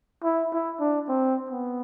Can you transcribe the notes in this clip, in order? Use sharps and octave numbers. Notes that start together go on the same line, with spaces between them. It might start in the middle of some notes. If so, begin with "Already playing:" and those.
E4
E4
D4
C4
B3